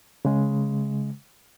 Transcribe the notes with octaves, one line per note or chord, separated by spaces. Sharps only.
C#3 G#3